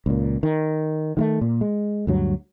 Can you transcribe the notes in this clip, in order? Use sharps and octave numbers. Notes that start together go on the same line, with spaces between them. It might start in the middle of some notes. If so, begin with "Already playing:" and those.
C#2 A#2
D#3
D#3 G#3 A3
A#2
G#3
D2 G2 F#3